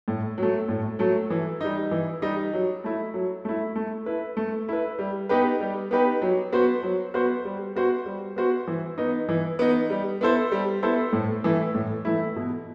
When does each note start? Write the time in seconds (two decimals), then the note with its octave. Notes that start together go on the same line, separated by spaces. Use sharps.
0.08 A2
0.38 F#3 A3
0.69 A2
0.99 F#3 A3
1.30 E3
1.61 G3 D#4
1.91 E3
2.22 G3 D#4
2.53 F#3
2.84 A3 E4
3.14 F#3
3.45 A3 E4
3.75 A3
4.06 E4 B4
4.37 A3
4.69 E4 B4
4.99 G3
5.29 B3 D#4 G4 B4
5.60 G3
5.91 B3 D#4 G4 B4
6.22 F#3
6.52 B3 F#4 C5
6.83 F#3
7.14 B3 F#4 C5
7.45 G3
7.75 B3 F#4 C5
8.06 G3
8.36 B3 F#4 C5
8.67 E3
8.98 B3 D#4
9.29 E3
9.59 B3 D#4
9.90 G3
10.21 B3 E4 A4 C5
10.52 G3
10.83 B3 E4 A4 C5
11.13 A2
11.44 E3 A3 E4
11.75 A2
12.05 E3 A3 E4
12.36 B2